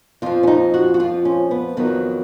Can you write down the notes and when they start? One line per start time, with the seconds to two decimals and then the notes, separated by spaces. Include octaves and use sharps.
0.22 F2 F3 F4
0.43 C#4
0.47 D#4
0.74 F#4
0.94 F#4
1.00 F2 F3 F4
1.25 C#4
1.51 B3
1.77 F2 D#3 F#3 B3